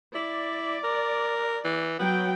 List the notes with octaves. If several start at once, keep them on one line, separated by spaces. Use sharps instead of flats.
E4 D5
A#4
E3
F#3 B3 G5